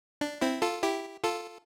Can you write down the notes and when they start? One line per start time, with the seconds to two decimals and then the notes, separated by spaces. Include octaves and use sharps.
0.21 D4
0.41 C4 E4
0.62 F4 A4
0.83 E4 G4
1.24 F4 A4